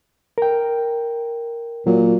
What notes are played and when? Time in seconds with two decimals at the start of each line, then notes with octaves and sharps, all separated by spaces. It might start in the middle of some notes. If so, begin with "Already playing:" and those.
0.38 A#4 G5
1.87 A#2 F#3